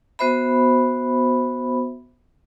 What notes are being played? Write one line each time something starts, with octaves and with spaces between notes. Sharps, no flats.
B3 F#4 C5 E5 B5